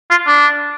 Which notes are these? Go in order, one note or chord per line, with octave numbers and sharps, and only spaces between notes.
F4
D4